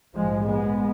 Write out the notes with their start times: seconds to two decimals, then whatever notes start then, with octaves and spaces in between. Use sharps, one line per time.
0.14 A#1 G#2 F3 G#3
0.43 G#3 B3